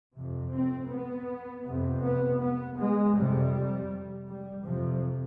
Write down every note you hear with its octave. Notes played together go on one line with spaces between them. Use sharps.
F2 C3
C4
B3
F2 C3
B3
B3
G#3
F2 C3 G3
G3
F2 C3 F3